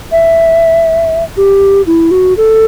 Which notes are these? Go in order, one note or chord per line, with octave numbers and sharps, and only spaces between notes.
E5
G4
E4
F#4
A4